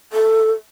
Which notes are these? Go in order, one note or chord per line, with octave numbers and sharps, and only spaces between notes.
A4